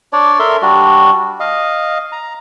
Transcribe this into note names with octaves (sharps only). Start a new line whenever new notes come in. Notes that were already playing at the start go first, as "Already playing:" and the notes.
D4 C#5 D5
A4 A#4 E5 C6
G3 D4 F#4
D#5 F5
A#5